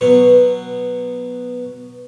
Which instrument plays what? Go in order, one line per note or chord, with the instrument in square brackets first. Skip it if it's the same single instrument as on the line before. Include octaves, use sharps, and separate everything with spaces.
[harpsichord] B2 F#3 B3